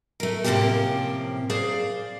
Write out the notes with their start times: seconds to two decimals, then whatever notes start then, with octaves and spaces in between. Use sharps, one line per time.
0.20 A3 A#4
0.44 A2 C3 F3 A#3 C#4 G4
1.50 G#4 C5 D5 F5